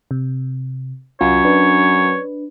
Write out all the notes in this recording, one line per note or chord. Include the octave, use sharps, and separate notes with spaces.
C3
C2 F#2 F4 C#5
D4 B4